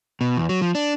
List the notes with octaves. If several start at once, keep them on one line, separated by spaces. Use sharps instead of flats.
B2
E2
F#3
F3
D4